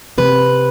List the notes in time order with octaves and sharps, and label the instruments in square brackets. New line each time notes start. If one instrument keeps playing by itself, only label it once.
[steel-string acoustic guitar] C3 B4